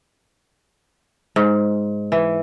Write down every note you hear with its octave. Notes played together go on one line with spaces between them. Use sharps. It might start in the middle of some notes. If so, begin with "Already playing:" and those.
G#2
E3